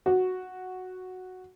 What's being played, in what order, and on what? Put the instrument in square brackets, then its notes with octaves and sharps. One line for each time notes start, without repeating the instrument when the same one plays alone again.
[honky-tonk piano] F#4